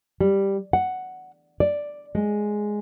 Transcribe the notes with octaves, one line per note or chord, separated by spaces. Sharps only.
G3
F#5
D5
G#3